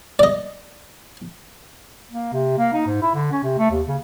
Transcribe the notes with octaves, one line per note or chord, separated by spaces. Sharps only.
D5 D#5
A#3
C3
A#3
D#4
G#2
E4
D3
C#4
C3
A3
D#2
C#3